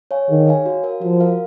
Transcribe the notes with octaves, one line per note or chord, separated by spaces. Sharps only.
C#5 F5 G#5
D#3 G#4
C#5 F5 G#5
F#4
A#4 F5
F3 F#4
A#4 F5